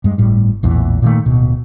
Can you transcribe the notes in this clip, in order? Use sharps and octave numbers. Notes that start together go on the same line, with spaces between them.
G2 G#3
G1 A2 G3
A#1 E2 A2 E3
A#2 D#3 A3
D1 B2